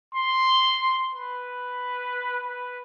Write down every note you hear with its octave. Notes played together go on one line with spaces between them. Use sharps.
C6
B4
B4